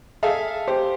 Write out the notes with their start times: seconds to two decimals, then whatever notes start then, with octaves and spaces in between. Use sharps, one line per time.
0.23 G#4 A4 E5 F5
0.68 G4 C5